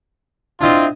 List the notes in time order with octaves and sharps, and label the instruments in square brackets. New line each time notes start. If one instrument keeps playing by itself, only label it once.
[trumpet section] C4 F4 [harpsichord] D4 E4 D#5